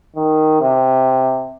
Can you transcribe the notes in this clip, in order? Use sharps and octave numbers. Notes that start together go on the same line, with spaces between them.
D#3
C3